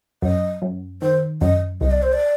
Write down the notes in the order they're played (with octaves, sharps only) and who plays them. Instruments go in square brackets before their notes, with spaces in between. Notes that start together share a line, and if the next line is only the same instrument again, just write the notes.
[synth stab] F#2 [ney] D#5
[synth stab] F#2
[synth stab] D#3 [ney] C5
[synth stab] F#2 [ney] D#5
[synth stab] C2 [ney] D#5
[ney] D5
C5
D5